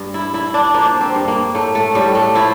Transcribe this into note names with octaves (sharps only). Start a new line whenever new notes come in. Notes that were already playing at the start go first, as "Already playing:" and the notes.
Already playing: G2
E4
G2 E4
D4
F3 A#3
C4
G2
A#3
A2 A3
A3
A2 G3
A3
F3 E4